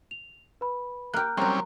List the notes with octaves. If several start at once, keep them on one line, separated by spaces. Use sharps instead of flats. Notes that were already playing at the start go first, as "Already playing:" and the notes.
F7
B4 B5
A#3 G4 A#5 F6 F#6
F#3 G3 A#3 C4 C#4